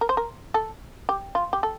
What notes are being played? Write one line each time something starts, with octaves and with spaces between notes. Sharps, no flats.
A#4
C5
A#4
A4
G4
F4
G4
A4